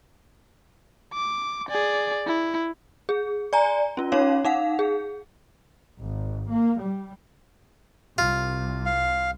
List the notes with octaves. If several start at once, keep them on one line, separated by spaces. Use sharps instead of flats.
D6
G#4 D5
E4
G#4
D5 G#5 A#5
C#4 F4
C#4 D#4 C#5 F5
D#4 F5 F#5
G#4
G#1
A#3
G3
C2 F4
F5